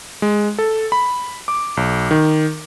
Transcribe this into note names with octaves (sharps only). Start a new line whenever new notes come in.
G#3
A4
B5
D6
B1
D#3